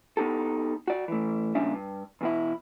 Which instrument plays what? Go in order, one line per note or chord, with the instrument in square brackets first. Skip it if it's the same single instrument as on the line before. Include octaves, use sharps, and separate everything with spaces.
[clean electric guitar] B3 D#4 G4 A4
F#4 D5
E3 A3
A#2 C#3 G3 C#4 D4 E5
G2
E2 B2 E4